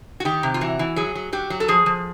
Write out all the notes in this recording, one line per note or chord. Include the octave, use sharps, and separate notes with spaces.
F#4
D#3 G4
C3
F4
E3 F#4
E3
F#3 G#4
F#3
F#3 G4
F#3
A4
F3 G#4
F3